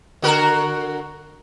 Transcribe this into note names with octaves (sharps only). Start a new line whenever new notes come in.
D3 F#4 A#4